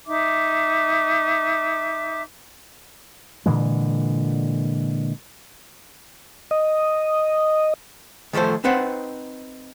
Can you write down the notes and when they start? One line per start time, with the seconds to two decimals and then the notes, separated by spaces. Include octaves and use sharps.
0.06 D#4 E5 D6
3.46 A#2 D3 E3 G#3
6.51 D#5
8.33 D#3 F3 A3 A4 C5
8.64 C4 D#4 B4 C5 F#5